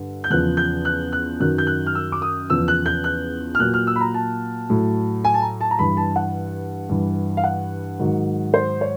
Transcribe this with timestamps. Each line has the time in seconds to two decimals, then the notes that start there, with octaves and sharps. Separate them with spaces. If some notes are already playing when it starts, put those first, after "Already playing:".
Already playing: G2 D3
0.24 G6
0.30 E2 C#3 F3 F#6
0.57 G6
0.85 F#6
1.13 F#6
1.40 F#2 D#3 F#3 F#6
1.58 G6
1.67 F#6
1.86 F6
1.95 E6
2.12 D6
2.22 D#6
2.50 E2 C#3 F3 E6
2.68 F#6
2.86 G6
3.04 F#6
3.55 F6
3.59 A#2 F#3 F#6
3.74 F6
3.87 E6
3.96 B5
4.01 A#5
4.14 A5
4.70 A2 F#3
5.25 G#5
5.34 A5
5.42 A#5
5.61 A5
5.71 A#5
5.79 G2 E3 B5
5.97 A5
6.16 F#5
6.89 G2 E3
7.37 F5
7.44 F#5
7.99 G#2 D#3 F#3
8.54 C5
8.81 C#5